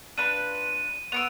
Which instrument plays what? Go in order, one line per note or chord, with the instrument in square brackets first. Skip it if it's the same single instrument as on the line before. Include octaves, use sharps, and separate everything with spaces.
[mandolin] D4 F4 B4 [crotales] D#7
[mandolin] B3 C#6 E6 [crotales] D7 F7